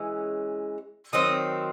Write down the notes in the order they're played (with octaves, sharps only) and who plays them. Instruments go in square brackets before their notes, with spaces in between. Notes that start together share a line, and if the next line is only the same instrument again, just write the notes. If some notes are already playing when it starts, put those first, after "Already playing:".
Already playing: [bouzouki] E3 G#3 C#4
[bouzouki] D#3 F#3 C4 [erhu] D#5